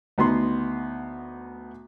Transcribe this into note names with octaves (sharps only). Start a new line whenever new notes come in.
D2 B3 D#4 C6